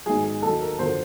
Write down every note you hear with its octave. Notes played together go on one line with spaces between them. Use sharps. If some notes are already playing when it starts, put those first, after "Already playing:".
G#2 D#3 F#3 G#4
G#4
D#2 D#3 F#3 A4
A#4
F#2 D3 F3 C5